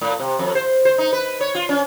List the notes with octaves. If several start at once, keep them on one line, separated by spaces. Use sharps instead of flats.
A2
C3
F2
C5
C5
D#4
B4
C#5
F4
C#4